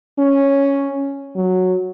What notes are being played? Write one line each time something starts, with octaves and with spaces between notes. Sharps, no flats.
C#4
F#3